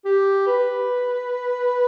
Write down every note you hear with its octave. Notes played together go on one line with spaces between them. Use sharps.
G4
B4